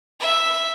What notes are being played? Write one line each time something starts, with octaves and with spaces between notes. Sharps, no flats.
E5